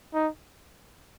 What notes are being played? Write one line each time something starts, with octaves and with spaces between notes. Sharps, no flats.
D#4